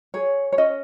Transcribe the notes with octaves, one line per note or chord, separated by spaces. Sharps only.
G#4 C#5
C#5
C#4 D#5